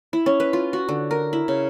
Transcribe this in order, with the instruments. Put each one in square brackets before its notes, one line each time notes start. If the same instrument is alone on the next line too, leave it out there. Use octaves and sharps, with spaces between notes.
[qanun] E4
C#4
B4
F4
F#4
D3
A#4
E4
C#3